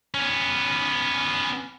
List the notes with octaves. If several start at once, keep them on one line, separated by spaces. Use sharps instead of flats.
B3 C#4